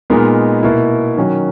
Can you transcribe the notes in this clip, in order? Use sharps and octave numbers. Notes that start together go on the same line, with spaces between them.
A#2 G#3 B3 D#4 A#4
B2 A#3 E4
D#3 F#3 C#4 F#4 A#4